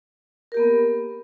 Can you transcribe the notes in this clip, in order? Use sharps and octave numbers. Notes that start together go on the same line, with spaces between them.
A#3 B3 G4 A#4